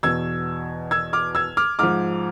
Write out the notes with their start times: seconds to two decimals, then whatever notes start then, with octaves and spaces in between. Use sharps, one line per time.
0.03 E2 B2 E6 G#6
0.91 E6 G#6
1.13 D6 F6
1.35 E6 G#6
1.57 D6 F6
1.79 G#2 F3 D6 F6